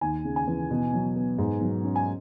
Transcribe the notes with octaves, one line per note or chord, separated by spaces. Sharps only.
D#2 G#5
C#3
G#5
E3
B2
F#3
B3
G#2
F#3
C#4
G#5